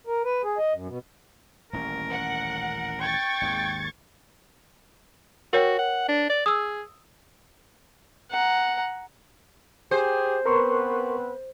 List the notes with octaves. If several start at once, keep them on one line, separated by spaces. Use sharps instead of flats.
A#4
B4
G#4
D#5
F#2
B2
D#1 A1 C#4 A#4
F#5
G5 C#6 G#6 A6
G#1 D#2 G#3
F#4 A#4 C#5 G5
F#5
D4
D5
G#4 D#6 E6
F#5 A#5
G4 G#4 C5
B3 C4 A#4 B4 C6 C#6